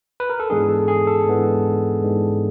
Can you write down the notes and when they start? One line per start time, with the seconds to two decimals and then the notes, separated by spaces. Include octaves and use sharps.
0.20 B4
0.30 A#4
0.40 A4
0.50 G#2 E3 G#3 B3 D4 G#4
0.69 A4
0.88 G#4
1.07 A4
1.26 G#2 E3 G#3 B3 D4
2.02 G#2 E3 G#3 B3 D4